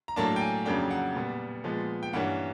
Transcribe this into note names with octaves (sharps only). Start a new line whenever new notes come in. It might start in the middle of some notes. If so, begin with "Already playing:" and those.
A#5
A2 F#3 A#3 D4 A5
G5
G#5
F2 C#3 F#3 A#3 D4 G5
F#5
A#2 G3 B3
A#2 F3 G#3 B3
G5
G2 E3 G3 A#3 C#4 F#5